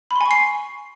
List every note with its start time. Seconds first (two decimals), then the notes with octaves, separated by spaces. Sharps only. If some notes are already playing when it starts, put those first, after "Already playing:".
0.11 B5
0.16 C6
0.21 G#5
0.26 C#6
0.31 C7